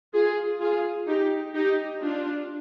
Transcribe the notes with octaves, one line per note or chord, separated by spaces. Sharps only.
F4 G#4
F4 G#4
D#4 G4
D#4 G4
D4 F4